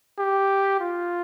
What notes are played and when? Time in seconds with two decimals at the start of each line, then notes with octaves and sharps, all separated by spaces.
0.19 G4
0.80 F4